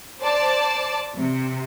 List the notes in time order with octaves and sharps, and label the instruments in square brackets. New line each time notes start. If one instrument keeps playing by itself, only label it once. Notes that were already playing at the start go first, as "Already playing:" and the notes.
[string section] C5 D5 A5
C3